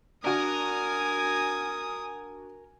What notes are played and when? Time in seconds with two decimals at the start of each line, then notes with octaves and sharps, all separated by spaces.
0.24 D4 F#4 A#4 G#5 D#6